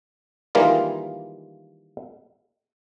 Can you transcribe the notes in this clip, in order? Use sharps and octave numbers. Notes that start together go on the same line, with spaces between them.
D#3 E3 G3 G#3 A#3 F4